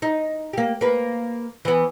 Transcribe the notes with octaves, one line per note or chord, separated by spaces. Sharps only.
D#4
A#3 G4
A#3 B4
E3 B3